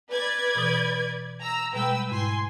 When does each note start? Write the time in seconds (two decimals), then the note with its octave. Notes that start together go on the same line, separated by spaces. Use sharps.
0.10 B4 D5 G#6
0.55 B2 E3 D#6
1.41 A#5 E6
1.73 B2 G3 G#3 B4 G5 E6
2.10 G#2 E4 G#5 C6